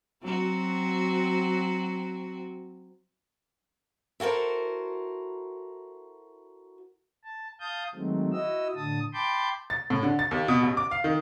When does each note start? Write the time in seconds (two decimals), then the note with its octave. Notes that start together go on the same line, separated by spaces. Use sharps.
0.23 F#3 C4 F#4
4.20 E4 F#4 A4 A#4 C5
7.24 A5
7.60 F5 A5 D#6 G6
7.95 D#3 F#3 G#3 A3 C4
8.32 E4 F#4 D#5 E6
8.76 A2 D3 A5 D#6
9.14 G5 A5 B5 C6 D6 G6
9.70 A6
9.90 A2
10.03 D3
10.19 A6
10.31 D#2
10.48 B2
10.63 A1
10.77 D6
10.91 F5
11.04 D#3